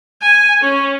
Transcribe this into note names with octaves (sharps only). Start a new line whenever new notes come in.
G#5
C#4